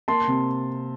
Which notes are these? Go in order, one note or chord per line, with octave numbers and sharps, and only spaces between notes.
A#3 A5 C6
C3